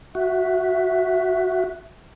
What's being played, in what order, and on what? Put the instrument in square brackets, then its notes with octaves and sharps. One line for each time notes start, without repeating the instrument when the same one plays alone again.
[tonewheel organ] F#4 [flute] E5